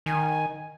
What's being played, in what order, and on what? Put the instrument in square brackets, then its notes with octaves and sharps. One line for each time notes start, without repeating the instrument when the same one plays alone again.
[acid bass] D#3 [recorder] G#5